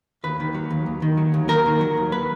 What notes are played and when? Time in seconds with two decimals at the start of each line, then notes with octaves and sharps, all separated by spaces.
0.24 D#2 B4
0.40 D#3
0.55 F#3
0.71 D#2
0.86 D#2
1.02 D#3
1.17 F#3
1.34 D#2
1.49 D#2 A#4
1.66 D#3
1.81 F#3
1.97 D#2
2.12 B4